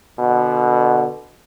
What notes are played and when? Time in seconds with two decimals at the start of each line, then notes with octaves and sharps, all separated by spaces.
0.19 B2 D3